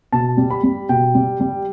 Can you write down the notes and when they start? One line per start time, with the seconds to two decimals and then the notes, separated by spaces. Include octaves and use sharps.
0.12 B2 A5
0.37 G3
0.50 B5
0.63 G3
0.89 B2 G5
1.15 G3
1.40 G3